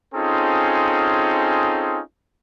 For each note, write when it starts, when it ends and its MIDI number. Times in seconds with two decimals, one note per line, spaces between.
0.14 2.00 60
0.14 2.00 61
0.14 2.00 63
0.14 2.00 65
0.14 2.00 68
0.14 2.00 69